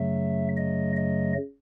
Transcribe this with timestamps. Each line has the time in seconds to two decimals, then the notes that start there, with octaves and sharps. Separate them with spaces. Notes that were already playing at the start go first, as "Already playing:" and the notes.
Already playing: F#2 C#3 F#3 A3 E5
0.57 D#5
0.96 D#5